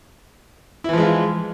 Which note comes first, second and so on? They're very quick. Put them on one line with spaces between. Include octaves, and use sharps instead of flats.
E4 E3 F3 G#3 F4